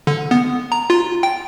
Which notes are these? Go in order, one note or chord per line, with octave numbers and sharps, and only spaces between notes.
D3
B3
A#5
F4
G5